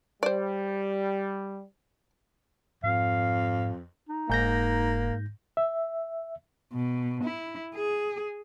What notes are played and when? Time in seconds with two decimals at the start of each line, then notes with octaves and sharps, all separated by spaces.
0.23 G3 C5 D5
2.84 F2 G#2 F5
4.09 D#4
4.30 F1 G#2 A#3 G6 A#6
5.57 E5
6.73 B2
7.24 E4
7.74 G#4